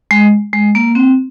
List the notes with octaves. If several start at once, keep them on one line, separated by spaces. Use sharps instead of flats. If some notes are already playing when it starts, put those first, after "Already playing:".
G#3
G#3
A#3
C4